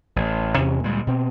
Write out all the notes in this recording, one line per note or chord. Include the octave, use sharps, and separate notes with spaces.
A1
E2 C3 C#4
D2 A#2 G3 G#3
B2 C4